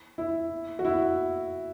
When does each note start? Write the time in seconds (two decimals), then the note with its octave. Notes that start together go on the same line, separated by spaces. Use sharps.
0.18 E4
0.79 F#4
0.85 E4